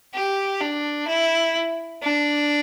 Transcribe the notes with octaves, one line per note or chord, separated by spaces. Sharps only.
G4
D4
E4
D4